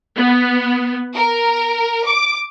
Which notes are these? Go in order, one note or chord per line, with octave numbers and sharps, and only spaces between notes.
B3
A#4
D6